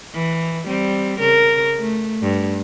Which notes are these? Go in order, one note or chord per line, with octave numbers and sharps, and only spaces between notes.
E3
G3 C4
C#3 A#4
A3
G2